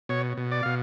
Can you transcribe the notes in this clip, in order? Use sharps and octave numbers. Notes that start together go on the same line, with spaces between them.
B2 C#5
B2
D5
B2 F5